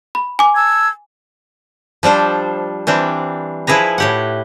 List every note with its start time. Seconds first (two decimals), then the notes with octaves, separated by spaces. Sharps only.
0.15 B5
0.39 G#5 D6
0.55 A5 E6 G#6
2.03 F3 G3 D4 C5
2.87 E3 G3 C4 D4
3.67 F3 E4 G#4 B4 A#5
3.98 A2 G4 F#5